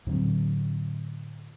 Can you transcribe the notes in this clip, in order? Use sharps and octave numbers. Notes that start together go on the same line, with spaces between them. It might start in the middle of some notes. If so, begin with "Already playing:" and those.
A2 D3 F#3 C4